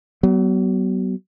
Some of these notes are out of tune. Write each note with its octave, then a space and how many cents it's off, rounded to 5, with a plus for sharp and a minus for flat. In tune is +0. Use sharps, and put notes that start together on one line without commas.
F#3 +40 B3 +0